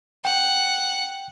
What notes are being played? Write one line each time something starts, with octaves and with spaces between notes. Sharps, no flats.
F#5 G5